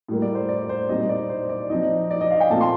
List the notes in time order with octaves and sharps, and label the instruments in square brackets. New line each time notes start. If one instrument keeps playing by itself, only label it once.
[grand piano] A2 G3 A#3
D5
C5
D5
C5
A#2 G3 C4 D#4 D#5
D5
C5
D5
F3 C4 D#4 D#5
D5
D#5
F5
G5
A#2 A3 C4 F4 A5
C6